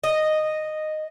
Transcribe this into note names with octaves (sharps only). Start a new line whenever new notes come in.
D#5